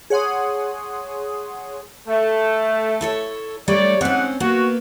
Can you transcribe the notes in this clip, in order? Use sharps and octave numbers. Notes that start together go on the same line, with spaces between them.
G#4 C#5 F#5 C6 D#6
A3
E4 A4 C#5
G3 A3 D4 C#5 D5
G#2 C4 C#4 F#5
A#3 B3 F#4